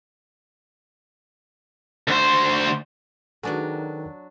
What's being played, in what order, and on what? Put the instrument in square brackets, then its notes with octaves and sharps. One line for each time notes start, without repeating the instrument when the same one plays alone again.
[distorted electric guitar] D2 C5
[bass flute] D#3 [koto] F#3 D4 [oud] F#4 G#4 [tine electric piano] A4 B4